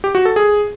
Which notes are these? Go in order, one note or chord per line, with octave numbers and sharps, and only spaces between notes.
G4
F#4
A4
G#4